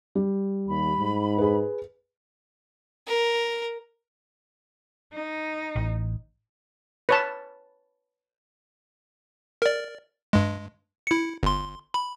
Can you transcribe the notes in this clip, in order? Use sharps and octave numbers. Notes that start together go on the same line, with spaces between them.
G3
D#2 B5
G#2
G#4 B4
A#4
D#4
A1
B4 C#5 A5
A#4 D5
G2 G#3
E4 C#7
G1 C6
B5